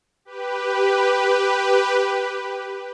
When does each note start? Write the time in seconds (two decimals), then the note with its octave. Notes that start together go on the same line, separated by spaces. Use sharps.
0.25 G4 B4